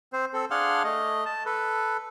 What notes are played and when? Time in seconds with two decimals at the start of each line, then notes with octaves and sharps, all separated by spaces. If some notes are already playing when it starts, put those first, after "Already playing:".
0.13 C4 C5
0.34 C4 A4
0.51 D4 G#4 F5 F#5 C6
0.84 A3 D#5
1.26 A5
1.46 A4 B4